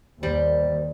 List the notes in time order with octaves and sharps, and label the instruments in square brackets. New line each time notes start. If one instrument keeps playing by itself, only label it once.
[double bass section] D#2 [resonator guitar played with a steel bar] G3 [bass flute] C5